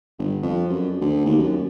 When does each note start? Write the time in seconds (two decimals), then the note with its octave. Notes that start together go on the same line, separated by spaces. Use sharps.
0.19 G1
0.42 F2
0.70 F#2
1.01 D2
1.26 D#2
1.39 F#2